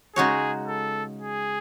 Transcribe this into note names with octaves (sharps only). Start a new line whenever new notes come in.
C#3 G#3 D#4 F#4 G#4 C#5
A4
G#4